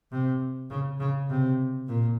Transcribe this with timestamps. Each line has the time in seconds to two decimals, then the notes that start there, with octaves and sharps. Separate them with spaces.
0.11 C3
0.70 C#3
1.00 C#3
1.29 C3
1.88 A#2